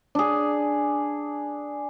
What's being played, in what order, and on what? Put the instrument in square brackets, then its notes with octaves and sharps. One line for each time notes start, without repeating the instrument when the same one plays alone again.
[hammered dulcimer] D4 G#4